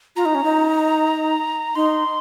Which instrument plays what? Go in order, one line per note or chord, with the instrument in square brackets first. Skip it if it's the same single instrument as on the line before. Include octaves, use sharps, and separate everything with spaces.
[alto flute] F4 [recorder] A#5
[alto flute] D#4
C#4
D#4
[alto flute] D#4 [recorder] C6